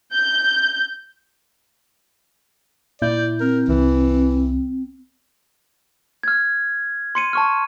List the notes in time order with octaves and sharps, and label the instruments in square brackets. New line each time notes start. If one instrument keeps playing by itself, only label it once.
[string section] G6
[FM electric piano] A#2 E4 G6 [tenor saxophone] D5
[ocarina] C4 [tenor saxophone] A#4
[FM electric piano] C2 [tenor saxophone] E3
[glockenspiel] F6 G#6
C6 C#7 D#7
A5 C#6 F6